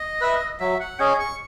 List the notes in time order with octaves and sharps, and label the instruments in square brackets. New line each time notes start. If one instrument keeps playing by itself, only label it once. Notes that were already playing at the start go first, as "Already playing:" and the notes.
Already playing: [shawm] D#5
[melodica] B4 E5
[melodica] F#3 [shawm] E5
[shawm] F#5
[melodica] C#4 G#4 D#5 [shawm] G#5
[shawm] C#6